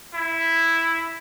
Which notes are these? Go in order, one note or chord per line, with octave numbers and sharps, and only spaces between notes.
E4